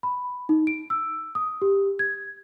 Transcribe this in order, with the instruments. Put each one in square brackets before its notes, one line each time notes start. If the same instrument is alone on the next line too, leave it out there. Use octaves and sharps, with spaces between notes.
[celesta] B5
D#4
D7
E6
D#6
G4
G#6